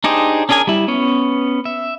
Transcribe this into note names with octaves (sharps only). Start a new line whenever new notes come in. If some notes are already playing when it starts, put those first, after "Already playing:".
D4 D#4 G4 G#4 C5
C#4 D4 G#4 A#4 G#5
G3 E4
B3 C#4
E5